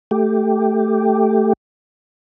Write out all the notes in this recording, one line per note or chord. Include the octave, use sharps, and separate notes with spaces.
A3 G4